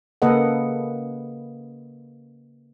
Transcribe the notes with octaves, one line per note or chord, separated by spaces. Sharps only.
C#3 A#3 A4 B4 D#5 F#5